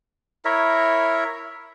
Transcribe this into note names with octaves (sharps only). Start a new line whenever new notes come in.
E4 A#4 C#5 E5